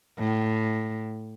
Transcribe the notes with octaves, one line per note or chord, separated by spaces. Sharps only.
A2